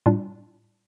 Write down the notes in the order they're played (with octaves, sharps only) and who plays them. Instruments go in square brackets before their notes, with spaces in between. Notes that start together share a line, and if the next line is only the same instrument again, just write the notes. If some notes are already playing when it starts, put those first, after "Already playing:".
[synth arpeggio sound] A2 G3 D4 F4